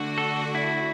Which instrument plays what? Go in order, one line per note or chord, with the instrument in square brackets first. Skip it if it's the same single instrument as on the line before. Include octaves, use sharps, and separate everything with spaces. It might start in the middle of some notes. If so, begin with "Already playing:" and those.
Already playing: [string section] D3 A3 D4 F#4
[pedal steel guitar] A4
E4